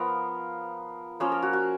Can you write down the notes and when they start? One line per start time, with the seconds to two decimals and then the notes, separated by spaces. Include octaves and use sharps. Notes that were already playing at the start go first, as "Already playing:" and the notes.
Already playing: F3 B3 F4 A#4
1.20 F3 A#3 C#4 F4
1.32 A#4
1.42 F#4
1.53 F#4